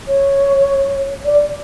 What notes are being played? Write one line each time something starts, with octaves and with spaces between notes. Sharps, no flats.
C#5
D5